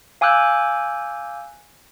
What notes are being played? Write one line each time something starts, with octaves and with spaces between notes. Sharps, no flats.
F5 G#5 D6 E6 F#6 G6